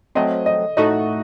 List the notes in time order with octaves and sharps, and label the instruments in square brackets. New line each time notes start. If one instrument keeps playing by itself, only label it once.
[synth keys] F#3 A3 C4 [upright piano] D#5
[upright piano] D#5
[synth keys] A2 A3 D#4 F#4 [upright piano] D#5